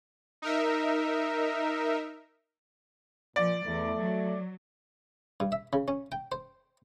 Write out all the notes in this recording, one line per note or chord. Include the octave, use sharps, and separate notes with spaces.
D#4 A#4 E5
A#2 F3 D5
E2 A3
F#3
G2
E5
C#3
C#4
G5
C5